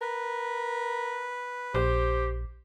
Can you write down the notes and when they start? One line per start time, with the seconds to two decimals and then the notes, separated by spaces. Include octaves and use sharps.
0.02 A#4 B4
1.74 A#1 G4 C5